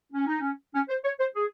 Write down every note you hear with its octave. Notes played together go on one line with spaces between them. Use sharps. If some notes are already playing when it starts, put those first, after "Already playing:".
C#4
D#4
C#4
C#4
C5
C#5
C5
G#4